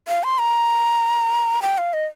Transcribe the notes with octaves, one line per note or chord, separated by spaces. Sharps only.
F5
C6
A#5
G5
F5
D#5